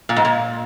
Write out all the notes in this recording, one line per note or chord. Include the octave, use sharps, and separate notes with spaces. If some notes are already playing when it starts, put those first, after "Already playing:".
A#2
G#2
A#2